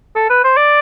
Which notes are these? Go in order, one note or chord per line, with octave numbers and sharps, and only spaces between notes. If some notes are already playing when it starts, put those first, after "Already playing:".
A4
B4
C5
D5